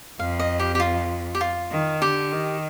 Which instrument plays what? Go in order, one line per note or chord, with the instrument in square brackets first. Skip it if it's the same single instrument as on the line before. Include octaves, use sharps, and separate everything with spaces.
[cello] F2 [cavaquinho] F5
[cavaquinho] D#5
G4
G4
F4
G4
F4
[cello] D#3
[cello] D3 [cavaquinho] G4
[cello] D#3